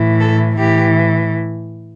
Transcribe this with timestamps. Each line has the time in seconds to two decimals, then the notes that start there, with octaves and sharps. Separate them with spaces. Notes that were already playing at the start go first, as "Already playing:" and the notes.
Already playing: A2 E3
0.20 A4
0.58 A2 E3 G4